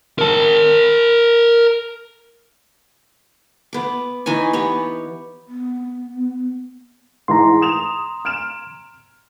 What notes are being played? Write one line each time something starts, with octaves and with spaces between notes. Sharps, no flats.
A#4 A5
B3 D6
E3 D#4 C#5 G#5
B3 G4 C#5
B3
G#2 E3 A#5 C6
D#6 E7 F7
F6 D7 E7